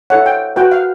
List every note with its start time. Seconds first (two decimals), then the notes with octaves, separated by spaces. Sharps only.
0.10 E4 A4 C#5 F#5
0.26 G5
0.56 F#4 B4 G5
0.72 F5